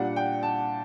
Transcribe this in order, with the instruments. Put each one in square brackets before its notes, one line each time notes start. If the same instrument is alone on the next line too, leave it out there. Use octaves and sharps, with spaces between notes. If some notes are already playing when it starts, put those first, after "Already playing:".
Already playing: [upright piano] A#2 G3 D4 F#5
G5
A5